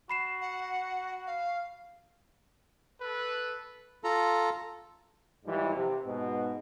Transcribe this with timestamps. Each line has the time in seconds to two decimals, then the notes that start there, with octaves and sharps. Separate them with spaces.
0.10 F#4 B5 C7 E7
0.41 F#5
1.27 F5
3.00 A4 B4
4.04 F4 A4 A#5
5.45 G#2 E3 F3 G3
5.75 C3
6.05 G#2 B2